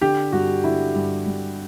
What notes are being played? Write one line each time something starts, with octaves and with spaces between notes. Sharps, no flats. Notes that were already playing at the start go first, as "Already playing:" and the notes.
D3 G4
G2 F#4
D3 E4
G2
G2